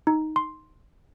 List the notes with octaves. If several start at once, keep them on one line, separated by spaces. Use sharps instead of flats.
D#4
C6